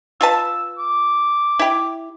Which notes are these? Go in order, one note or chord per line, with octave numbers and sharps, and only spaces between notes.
F4 B4 A5 E6
D6
E4 G4